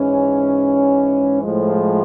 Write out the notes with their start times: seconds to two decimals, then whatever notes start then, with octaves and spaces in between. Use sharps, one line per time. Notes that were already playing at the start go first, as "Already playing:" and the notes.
Already playing: G#2 E3 G#3 C#4
1.42 A2 F3 G#3